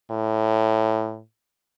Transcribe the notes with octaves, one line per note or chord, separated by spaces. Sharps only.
A2